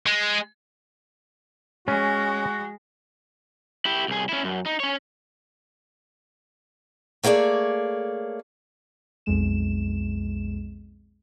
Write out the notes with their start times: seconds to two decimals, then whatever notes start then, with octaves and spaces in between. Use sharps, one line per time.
0.07 G#3
1.88 G#3 C#4 F#4
3.85 E4 G4
4.08 C2 G#4
4.29 C#4 E4
4.44 F#2
4.66 D#4
4.80 C#4 C#5
7.23 A3 A#3 G#4 C#5 D5
9.26 B1 F2 G#3 E7